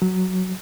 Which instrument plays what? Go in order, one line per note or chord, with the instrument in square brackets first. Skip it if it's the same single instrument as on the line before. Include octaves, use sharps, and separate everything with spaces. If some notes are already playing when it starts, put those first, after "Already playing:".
[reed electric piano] F#3